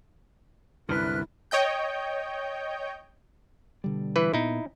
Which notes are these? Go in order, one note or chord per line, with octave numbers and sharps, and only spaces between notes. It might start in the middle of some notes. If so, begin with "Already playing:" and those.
C2 F#2 D3 E4 B4 F6 F#6
C#5 D#5 G5 G6
B2 D3 G3
E3 B4
A#2 B3 D#4 E4